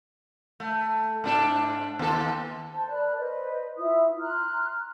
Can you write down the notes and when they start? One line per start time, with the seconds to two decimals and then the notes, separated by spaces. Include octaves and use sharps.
0.60 A3
1.24 G#2 D4 A4
1.99 D#2 A4
2.74 C5 A5
2.91 A#4 D5 B5 F#6
3.18 B4 C5 D#5
3.77 E4 F4 D#6
4.19 A#5 C6 F6 F#6